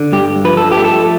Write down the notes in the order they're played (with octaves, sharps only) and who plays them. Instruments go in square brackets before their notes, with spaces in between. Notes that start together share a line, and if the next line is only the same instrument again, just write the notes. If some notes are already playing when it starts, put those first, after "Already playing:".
Already playing: [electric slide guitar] D3
G2 G4
F3 B4
A4
A3 G4
A4